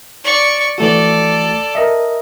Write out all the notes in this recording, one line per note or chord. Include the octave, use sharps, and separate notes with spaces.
D5 C#6
E3 A3 F#4 A4 D5
A#4 D#5 E5